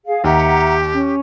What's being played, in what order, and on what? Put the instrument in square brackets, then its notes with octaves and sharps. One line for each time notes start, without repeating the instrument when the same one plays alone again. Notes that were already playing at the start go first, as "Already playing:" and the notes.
[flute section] G#4 F5
[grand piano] D#2 [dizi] G4 [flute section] E5 F#5 A#5
[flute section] C#4